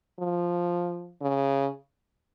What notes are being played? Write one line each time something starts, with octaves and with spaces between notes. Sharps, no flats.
F3
C#3